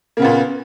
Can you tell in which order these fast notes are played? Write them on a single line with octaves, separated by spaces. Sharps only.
A#3 C#3 B3 A#2